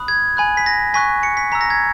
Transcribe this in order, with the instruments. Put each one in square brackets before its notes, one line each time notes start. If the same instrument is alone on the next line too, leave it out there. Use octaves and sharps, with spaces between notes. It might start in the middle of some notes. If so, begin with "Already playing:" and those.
Already playing: [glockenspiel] B5 D#6 F#6
G#6
G#5 B5 F#6
B6
A#6
G#5 C#6 F#6 B6
C#7
B6
A#5 E6 B6
A#6
G#6